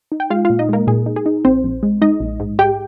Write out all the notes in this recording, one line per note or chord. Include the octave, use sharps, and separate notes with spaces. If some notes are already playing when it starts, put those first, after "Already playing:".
D#4
G5
G#3 F4 F5
A#2 F4 F5
D#4 D#5
G#3 A#3 A#4
A#2 G#4
D#4
G#4
D#4
A#1 C4 C5
A#1
G#3
G#3 D#4 D#5
A#1
G#2
G#3 G4 G5